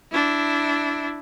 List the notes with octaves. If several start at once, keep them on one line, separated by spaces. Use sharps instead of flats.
D4 E4